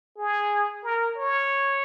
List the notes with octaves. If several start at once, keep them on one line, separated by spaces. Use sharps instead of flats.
G#4
A#4
C#5